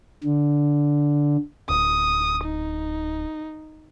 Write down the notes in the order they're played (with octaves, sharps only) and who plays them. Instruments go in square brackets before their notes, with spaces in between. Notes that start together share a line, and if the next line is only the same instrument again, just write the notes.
[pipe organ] D3
[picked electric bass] D1 [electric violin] D#6
[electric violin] D#4